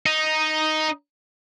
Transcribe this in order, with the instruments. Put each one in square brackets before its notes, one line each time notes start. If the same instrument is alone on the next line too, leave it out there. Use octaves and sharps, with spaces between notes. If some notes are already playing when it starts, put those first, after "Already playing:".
[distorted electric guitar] D#4